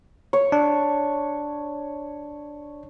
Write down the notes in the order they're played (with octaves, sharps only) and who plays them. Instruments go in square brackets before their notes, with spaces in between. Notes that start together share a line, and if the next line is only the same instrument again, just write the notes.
[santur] C#5
[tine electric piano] D4